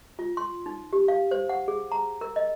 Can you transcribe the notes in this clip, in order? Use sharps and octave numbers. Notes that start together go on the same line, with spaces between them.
F4
C6
D#4
G4
F5
C5
F#5
G#4
A#5
A#4
D#5